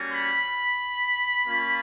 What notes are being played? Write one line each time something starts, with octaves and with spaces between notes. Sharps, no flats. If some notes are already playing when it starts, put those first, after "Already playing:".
Already playing: G3 A#3 C#4 F#4
B5
A#3 C#4 F4